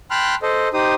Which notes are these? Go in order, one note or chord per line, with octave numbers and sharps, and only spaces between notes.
G5 A5 B5 C6 F6 F#6
A4 C5 D#5
D#4 G4 C5 D#6